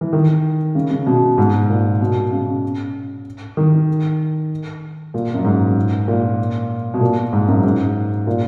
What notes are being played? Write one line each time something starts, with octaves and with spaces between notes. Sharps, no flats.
E3
D#3
C#3
C#3
B2
G#2
A#2
B2
C#3
D#3
A#2
F#2
G#2
A#2
B2
A#2
G#2
F#2
G#2
A#2